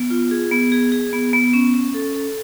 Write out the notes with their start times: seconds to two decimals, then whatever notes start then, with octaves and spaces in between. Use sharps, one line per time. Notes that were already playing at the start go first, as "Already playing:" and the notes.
Already playing: B3
0.10 F4
0.31 G#4
0.51 B3
0.72 G#4
0.92 G#4
1.13 B3
1.33 B3
1.53 C#4
1.74 C#4
1.94 A4
2.15 A4